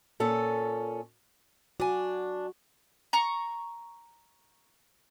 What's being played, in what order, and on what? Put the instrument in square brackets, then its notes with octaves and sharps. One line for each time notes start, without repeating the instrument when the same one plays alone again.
[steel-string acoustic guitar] A#2 C#4 A4
[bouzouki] D4 G#5 [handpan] F#4
[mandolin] A#5 C#6